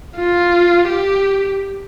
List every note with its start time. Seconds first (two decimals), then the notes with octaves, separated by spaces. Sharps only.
0.17 F4
0.88 G4